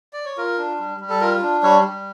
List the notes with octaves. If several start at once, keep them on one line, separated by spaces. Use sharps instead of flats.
D5
C#5
F4 A#4
D4
G3
G3
A4
F4 A#4
D4
G3 C#5
G3